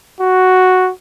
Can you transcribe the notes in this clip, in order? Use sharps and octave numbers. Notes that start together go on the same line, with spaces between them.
F#4